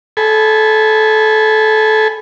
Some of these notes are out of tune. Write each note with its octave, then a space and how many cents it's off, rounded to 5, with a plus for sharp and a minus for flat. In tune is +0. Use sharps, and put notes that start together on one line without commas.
A4 -20 G#5 +0 B5 +5